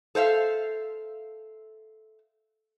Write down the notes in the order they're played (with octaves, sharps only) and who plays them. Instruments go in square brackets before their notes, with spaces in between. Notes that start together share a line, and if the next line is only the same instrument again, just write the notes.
[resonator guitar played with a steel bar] A4 C5 E5 F5